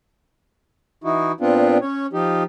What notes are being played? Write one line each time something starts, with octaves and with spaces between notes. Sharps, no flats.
E3 D#4 E4 F#4
A#2 B3 C4 D4 F4
C#4 C#5
F3 D#4 G4